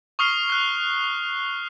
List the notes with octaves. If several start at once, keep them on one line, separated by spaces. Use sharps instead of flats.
C#6 D#6 F6 C7 G7
F6 F#6